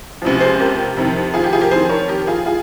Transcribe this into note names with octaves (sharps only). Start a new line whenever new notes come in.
C#2 C3 F3
G#4 C5
G4 A#4
F2 C3 D#3
F4 G#4
G4
F4 G#4
G4 A#4
F2 D#3 G#4 C5
A#4 C#5
G4 A#4
F4 G#4
F4 G#4